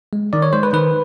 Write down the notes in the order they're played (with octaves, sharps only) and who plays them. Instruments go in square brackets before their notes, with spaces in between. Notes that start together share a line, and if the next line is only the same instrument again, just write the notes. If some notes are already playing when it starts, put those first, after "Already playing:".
[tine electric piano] G#3
D#3 D5
C#5
G#3 C5
B4
D#3 B4